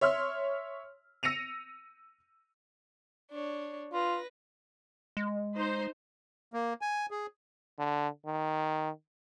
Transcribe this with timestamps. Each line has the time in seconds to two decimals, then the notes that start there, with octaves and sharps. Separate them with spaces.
0.01 C#5 E5 C6 F6
1.23 E6 A#6 C#7 D#7 F7
3.31 D4 C#5
3.93 F4 B4 A#6
5.17 G#3
5.56 D#4 C5
6.54 A#3
6.81 G#5
7.11 G#4
7.79 D3
8.26 D#3